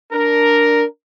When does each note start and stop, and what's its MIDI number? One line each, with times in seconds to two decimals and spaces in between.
0.13 0.84 62
0.13 0.84 70